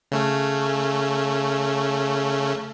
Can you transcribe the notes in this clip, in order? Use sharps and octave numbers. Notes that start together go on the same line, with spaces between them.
C#3 A3 C#4